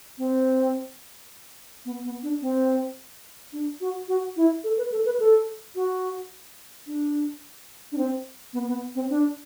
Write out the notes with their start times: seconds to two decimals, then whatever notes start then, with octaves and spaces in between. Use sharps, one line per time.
0.18 C4
1.85 B3
2.04 B3
2.23 D4
2.42 C4
3.53 D4
3.81 F#4
4.08 F#4
4.37 E4
4.64 A4
4.78 B4
4.92 A4
5.05 B4
5.20 A4
5.75 F#4
6.87 D4
7.92 D4
7.98 C4
8.53 B3
8.68 B3
8.95 C4
9.10 D4